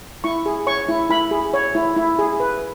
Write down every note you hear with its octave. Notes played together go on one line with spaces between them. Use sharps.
E4 C#6
G#4
C#5 C#6
E4
E4 B5
G#4
C#5
E4
E4
G#4
B4